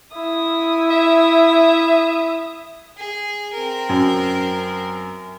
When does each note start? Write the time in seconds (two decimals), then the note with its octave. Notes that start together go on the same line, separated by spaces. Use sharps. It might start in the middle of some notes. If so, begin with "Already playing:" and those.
0.14 E4 D#6
0.91 E5
2.98 G#4
3.53 C4 A#4
3.89 F#2